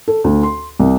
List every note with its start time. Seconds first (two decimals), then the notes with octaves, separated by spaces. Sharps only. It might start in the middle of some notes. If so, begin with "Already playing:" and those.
0.08 A4
0.24 D2
0.43 C6
0.79 C2